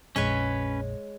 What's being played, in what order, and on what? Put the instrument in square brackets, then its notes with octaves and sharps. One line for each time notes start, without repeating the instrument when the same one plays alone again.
[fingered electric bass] A#1 F2 A#2 [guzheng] G#3 C#5 G#5 [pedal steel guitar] C#4 B4